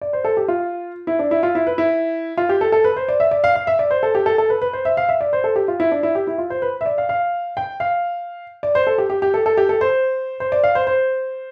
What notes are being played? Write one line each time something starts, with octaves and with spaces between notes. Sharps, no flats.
D5
C5
A4
G4
F4
E4
D4
E4
F4
E4
B4
E4
F4
G4
A4
A4
B4
C5
D5
E5
D5
F5
F5
E5
D5
C5
A4
G4
A4
A4
B4
B4
C5
E5
F5
E5
D5
C5
A4
G4
F4
E4
D4
E4
G4
E4
F4
C5
B4
E5
D5
F5
F5
G5
F5
D5
C5
A4
G4
G4
G4
A4
A4
G4
A4
C5
C5
D5
F5
C5
C5